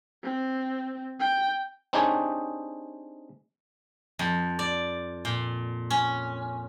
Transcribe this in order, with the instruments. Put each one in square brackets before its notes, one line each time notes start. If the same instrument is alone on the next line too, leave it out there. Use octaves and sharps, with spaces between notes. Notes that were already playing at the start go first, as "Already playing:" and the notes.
[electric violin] C4
G5
[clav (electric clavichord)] C4 D4 D#4 G4 G#4 C#5
[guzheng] F2
D5
A#2
C#4